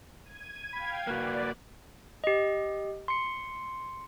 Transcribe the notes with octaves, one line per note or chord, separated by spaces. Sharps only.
G#6 D#7
F5 G5 B5 G#6
A#3 F#4 B4 D5
G4 D#5
C6 C#7